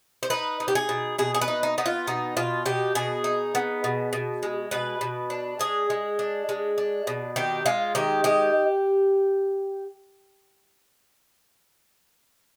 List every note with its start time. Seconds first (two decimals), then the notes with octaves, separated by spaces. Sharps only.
0.23 C5
0.30 D#4 B4
0.60 D#4
0.68 G4
0.75 G#4
0.89 B2
1.18 B2 G#4
1.34 G#4
1.41 B4
1.48 D#4
1.63 D#4
1.78 B3 D#4
1.86 F4
2.07 B2 D#4
2.37 B2 F4
2.66 B2 G4
2.95 B2 G#4
3.24 D#4
3.55 B3
3.84 B2
4.13 B2
4.43 G#3
4.71 B2 B4
5.01 B2
5.30 D4
5.59 G#3 G#4
5.90 G#3
6.19 D4
6.49 G#3
6.78 D4
7.07 B2
7.36 D#3 G4
7.66 G#3 F4
7.95 D#3 G4
8.24 G#3 G4